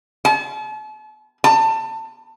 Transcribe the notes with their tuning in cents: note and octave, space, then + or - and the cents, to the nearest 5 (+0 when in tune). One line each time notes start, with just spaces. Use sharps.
A5 -40
A5 +25